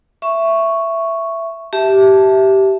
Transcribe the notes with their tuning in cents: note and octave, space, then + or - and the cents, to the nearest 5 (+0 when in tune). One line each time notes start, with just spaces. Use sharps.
E5 +10 C#6 +0
G4 -15 E5 +0 A5 -5